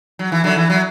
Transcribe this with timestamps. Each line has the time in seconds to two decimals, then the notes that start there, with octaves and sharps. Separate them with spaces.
0.19 F#3
0.32 E3
0.44 D3 F#3
0.56 E3
0.70 F#3